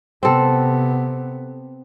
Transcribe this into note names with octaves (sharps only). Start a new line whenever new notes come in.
C3 B3 C4 A4